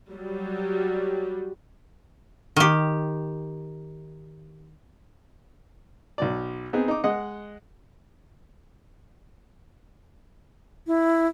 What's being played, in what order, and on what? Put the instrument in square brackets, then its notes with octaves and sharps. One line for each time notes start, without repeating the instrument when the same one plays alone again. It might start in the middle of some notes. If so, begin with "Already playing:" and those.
[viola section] F#3 G3
[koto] D#3 G4
[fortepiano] B1 F#3 D5
B3 C4 D#4 G#4
D#4 D6
G#3 D#5 F#5
[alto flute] E4